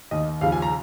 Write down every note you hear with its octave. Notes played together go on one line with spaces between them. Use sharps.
D#2 D#3 D#5
D#2 C#3 F3 F5
G#5
A#5